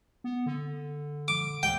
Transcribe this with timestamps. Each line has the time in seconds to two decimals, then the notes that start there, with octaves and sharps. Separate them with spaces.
0.24 B3
0.46 D3
1.28 D6
1.63 D#2 G5